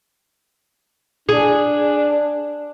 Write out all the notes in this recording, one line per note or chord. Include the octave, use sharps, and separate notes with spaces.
D4 G#4